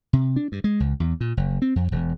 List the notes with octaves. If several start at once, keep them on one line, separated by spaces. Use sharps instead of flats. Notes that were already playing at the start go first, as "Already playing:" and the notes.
C3
D4
G2
G#3
C#2
E2
A#2
F#1
C4
F2
E1